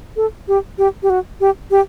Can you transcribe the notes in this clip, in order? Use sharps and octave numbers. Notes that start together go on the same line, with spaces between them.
A4
G4
G4
G4
F#4
G4
G4